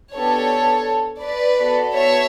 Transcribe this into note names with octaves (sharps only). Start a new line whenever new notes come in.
B3 D4 G4 A4 C#5
B4 D5
B3 F#4 A4
C#5 E5